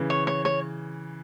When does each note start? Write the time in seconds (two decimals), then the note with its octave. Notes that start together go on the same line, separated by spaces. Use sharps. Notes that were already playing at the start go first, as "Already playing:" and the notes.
Already playing: C#3 E3
0.10 C#5
0.27 C#5
0.45 C#5